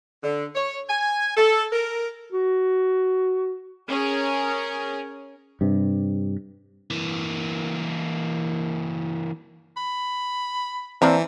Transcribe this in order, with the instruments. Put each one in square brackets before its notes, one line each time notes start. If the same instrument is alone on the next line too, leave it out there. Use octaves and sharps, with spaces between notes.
[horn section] D3
C#5
G#5
A4
A#4
[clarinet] F#4
[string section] C#4 G#4 A#4
[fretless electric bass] G2 C3
[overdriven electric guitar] E3 A#3
[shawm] B5
[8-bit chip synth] E3 [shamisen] A#3 D4 A#5 [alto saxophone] C4